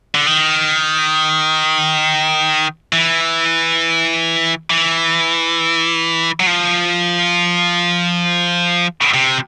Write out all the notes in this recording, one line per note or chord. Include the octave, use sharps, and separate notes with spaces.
D3
D#3
E3
E3
F#3
F3
C3